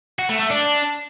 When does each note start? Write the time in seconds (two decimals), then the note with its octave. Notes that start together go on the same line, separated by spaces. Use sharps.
0.19 F#4
0.29 A3
0.40 A3
0.50 D4